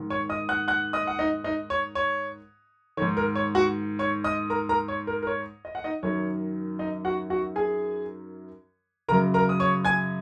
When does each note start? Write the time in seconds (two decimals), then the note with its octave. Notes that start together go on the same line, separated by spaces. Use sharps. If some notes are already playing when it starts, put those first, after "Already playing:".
Already playing: G#2 D#3
0.10 C#5 C#6
0.29 D#5 D#6
0.49 F#5 F#6
0.68 F#5 F#6
0.93 D#5 D#6
1.07 F#5
1.19 D#4 D#5
1.44 D#4 D#5
1.70 C#5
1.95 C#5
2.97 D#3 C#5
3.02 G#2
3.17 A#4
3.35 C#5
3.55 F#4 F#5
3.99 C#5 C#6
4.24 D#5 D#6
4.50 A#4 A#5
4.69 A#4 A#5
4.88 C#5
5.07 A#4
5.23 A#4
5.27 C#5
5.65 D#5
5.75 F#5
5.84 D#4 D#5
6.03 F#2 D#3 C#5
6.79 D#4 D#5
7.05 F#4 F#5
7.30 F#4 F#5
7.56 G#4 G#5
9.08 F#2 C#3 A#4 A#5
9.34 A#4 A#5
9.49 D#6
9.60 C#5 C#6
9.85 G#5 G#6